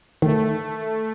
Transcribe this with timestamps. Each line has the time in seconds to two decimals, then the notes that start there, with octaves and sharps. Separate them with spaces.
0.22 D#3 A3